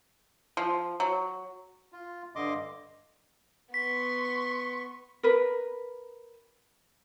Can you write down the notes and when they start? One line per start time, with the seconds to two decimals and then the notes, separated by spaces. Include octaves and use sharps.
0.57 F3
1.00 F#3
1.93 F4
2.35 G2 D3 D#5 C6 D6
3.74 B3 C6 C#6 B6
5.23 A#4 B4